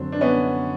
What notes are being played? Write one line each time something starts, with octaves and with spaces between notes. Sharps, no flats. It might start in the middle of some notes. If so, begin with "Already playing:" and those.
Already playing: F#2 D3 F#3 C4 D4
D4
B3 C#4